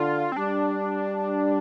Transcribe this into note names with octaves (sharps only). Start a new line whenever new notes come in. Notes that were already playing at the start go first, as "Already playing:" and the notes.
Already playing: D3 F4
C4
G3 D4